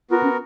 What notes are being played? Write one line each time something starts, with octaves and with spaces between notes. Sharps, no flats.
B3 F4 F#4 A#4
C#4